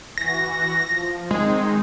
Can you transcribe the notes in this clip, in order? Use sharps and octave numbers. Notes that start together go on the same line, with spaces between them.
E3 F#4 A#6
F3
D#3 G#3 C4 D#4